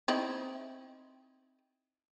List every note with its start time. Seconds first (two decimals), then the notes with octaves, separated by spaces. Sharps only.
0.08 C4 D#4 E4